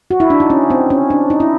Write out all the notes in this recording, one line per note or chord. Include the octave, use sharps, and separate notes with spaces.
F#4
E4
D4
D#4
C#4
C4
C#4
D4
D#4
E4